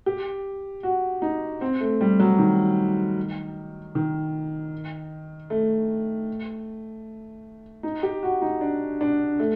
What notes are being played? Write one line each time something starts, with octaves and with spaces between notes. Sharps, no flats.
G4
F#4
D#4
C4
A3
G3
F#3
D#3
D#3
A3
D#4
G4
F#4
D#4
D4
D4
A3